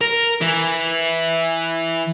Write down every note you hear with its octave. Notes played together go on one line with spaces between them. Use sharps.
A#4
E3